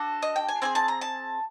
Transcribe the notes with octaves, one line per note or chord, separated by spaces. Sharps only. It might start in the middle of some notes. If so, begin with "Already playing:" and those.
Already playing: D4 F#4 A4
D#5
G5
G#5
C4 E4 G#4 G#5
A5
A#5
A5